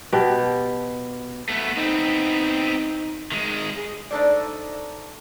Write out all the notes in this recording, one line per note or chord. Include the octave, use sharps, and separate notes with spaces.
B2 G4
A3 B3
B3 C4 D#4
D#3 G#3
G#4
A3 D4 D#4 A4 C5 D5